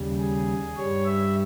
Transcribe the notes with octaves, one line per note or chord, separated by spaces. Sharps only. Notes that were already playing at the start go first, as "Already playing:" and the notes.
Already playing: D#2 C#3 G3
G#4
G2 G3 C#5
E5